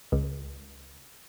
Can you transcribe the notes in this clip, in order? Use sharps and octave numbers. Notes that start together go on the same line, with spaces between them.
C#2